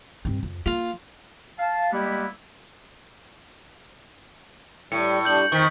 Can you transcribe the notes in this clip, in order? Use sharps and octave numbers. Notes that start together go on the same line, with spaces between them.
G2 C4
F2
A#3 F4
F5 A5
G3 G#3 A#3 B3 E4 G4
A2 G3 C#7
G3 D4 G6 F#7
F2 D#3 D#4 C5 C#6 B6